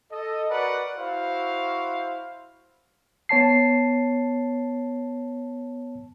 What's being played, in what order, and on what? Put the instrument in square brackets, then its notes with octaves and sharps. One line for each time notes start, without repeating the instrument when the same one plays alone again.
[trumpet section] A4 D#5
F#4 A#4 B4 D5 F#5
E4 F#4 C5 F5
[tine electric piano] B3 C#5 A5 C7